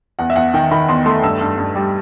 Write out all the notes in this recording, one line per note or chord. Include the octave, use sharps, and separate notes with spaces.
E2 F#5
E5
E2 F#5
D#3 G5
D#3 B5
E2 C6
A3 C6
G2 E6
G2
G2
G3